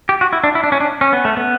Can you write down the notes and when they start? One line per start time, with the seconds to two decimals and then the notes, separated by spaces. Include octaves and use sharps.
0.09 G4
0.21 F#4
0.33 E4
0.44 D4
0.55 E4
0.64 D4
0.72 C#4
0.80 D4
1.01 C#4
1.13 B3
1.25 A3
1.37 B3